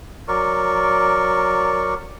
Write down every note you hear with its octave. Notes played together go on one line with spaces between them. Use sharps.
F#3 A#4 D5 C#6